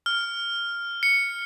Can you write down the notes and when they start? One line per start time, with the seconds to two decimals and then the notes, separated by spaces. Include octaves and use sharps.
0.06 F6
1.03 C#7